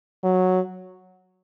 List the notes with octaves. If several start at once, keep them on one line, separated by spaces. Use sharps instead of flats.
F#3